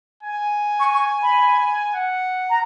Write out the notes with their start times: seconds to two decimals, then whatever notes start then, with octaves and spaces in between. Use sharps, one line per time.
0.23 G#5
0.80 C#6
0.93 C#6
1.22 B5
1.94 F#5
2.50 A#5